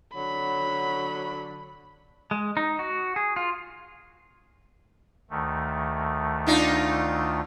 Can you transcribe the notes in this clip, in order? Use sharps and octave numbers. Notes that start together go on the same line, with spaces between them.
D3 F#3 B5
G#3
D#4
F#4
G#4
F4
D2 D#3 A3
D4 D#4 F4